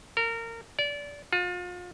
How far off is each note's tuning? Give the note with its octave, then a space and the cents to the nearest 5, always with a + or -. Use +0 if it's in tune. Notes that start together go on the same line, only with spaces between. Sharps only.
A#4 -25
D5 -25
F4 +35